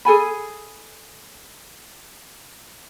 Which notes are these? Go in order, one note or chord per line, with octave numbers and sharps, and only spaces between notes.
G#4 A4 G#5 B5